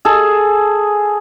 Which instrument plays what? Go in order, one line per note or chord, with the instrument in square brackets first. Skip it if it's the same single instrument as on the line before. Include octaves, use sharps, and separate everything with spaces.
[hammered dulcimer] G#4 A4